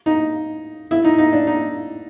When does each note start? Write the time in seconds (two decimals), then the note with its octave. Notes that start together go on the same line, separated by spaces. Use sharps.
0.06 D#4
0.91 E4
1.04 D#4
1.18 D#4
1.33 D4
1.47 D#4